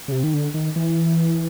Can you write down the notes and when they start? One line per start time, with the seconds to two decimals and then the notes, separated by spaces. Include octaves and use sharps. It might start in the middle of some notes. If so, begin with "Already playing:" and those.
0.08 C#3
0.12 C3
0.23 D#3
0.34 D3
0.54 D#3
0.76 E3